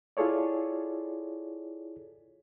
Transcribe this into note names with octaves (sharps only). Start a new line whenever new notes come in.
E4 F4 G#4 A4 C#5 D5